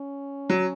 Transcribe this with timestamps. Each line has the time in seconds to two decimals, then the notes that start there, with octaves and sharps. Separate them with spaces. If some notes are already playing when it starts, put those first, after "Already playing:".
Already playing: C#4
0.50 F#3